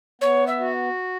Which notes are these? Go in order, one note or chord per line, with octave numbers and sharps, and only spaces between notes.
B3 C#5
E5
F#4